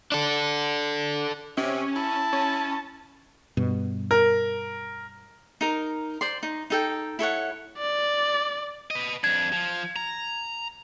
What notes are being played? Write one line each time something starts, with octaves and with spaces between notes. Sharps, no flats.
D4 A4
C3 C#4
E4 A5
C#4
G2 B2
A#4
D#4 A#4
C5 D5 C6
D#4
D#4 A4 G5
E4 A4 C#5 F#5
D5
B4 D#5
F2 D4 G#6
F3
A#5